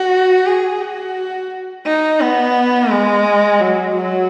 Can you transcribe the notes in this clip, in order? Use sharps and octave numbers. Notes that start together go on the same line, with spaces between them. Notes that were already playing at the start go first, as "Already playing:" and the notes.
Already playing: F#4
G#4
F#4
D#4
B3
G#3
F#3
F#3